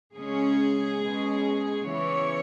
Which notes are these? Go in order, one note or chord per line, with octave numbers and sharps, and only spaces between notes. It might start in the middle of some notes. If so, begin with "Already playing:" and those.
C#3 G#3 C#4 G#4
B2 G#3 C#4
C#3 E3 B3 C#5